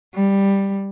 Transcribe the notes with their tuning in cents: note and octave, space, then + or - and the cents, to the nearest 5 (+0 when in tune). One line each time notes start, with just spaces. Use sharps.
G3 +5